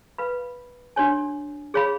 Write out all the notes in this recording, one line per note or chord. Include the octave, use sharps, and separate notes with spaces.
B4 F5 B5
D4 F#4 C#5 G#5
G#4 C#5 F5 B5